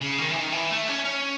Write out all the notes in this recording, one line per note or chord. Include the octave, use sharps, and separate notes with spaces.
C#3
D#3
E3
D#3
E3
A3
C#4
C#4